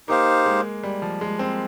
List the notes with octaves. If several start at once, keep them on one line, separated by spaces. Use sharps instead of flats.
A#3 D#4 G4 C5 F5
G#3
G3
F3
G#3
C4